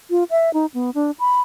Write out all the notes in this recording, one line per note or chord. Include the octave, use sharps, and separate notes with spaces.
F4
E5
D#4
B3
D4
B5